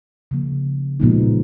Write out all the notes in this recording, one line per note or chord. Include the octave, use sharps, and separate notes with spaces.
C#3 F3 A#3
A#2 F3 G#3 B3 D#4